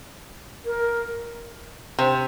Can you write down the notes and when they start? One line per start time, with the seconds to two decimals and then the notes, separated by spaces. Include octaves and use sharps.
0.66 A#4
1.99 C3 C5